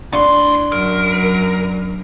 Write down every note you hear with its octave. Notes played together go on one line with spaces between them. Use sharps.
A2 D4 C6
F#2 A#4